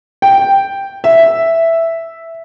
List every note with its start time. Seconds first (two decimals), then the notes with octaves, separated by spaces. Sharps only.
0.22 G5
1.04 E5